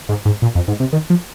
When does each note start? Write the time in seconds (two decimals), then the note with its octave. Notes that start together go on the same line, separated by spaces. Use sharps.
0.09 G#2
0.25 G#2
0.42 A#2
0.55 F2
0.68 G#2
0.80 C3
0.93 D#3
1.10 F3